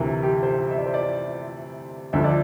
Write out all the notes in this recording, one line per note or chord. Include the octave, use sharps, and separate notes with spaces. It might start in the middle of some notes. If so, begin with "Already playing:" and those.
Already playing: D2 C3 E3 A#4
G4
C5
E5
D5
C5
D5
D2 D3 F3 E5
D5